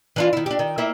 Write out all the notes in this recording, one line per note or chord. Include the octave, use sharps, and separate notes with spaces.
E3 D4 F4
D#3 E4
D4 G4
D#3
A#3 E4 E5